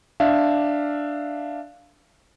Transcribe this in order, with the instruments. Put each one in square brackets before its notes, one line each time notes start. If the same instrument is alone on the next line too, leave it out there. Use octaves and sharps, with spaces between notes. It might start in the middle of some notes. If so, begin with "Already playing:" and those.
[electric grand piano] D4 E5 F5